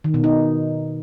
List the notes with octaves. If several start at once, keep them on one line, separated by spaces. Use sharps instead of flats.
D#3
B2
D#4